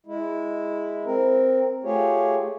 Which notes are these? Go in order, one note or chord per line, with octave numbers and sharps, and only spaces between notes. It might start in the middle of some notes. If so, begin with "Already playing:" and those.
G#3 E4
C4 A#4
A3 F4 G4 G#4 C#5